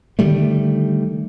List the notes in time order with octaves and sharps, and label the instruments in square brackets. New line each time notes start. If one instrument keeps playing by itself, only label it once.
[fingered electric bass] D3 D#3 G3 A3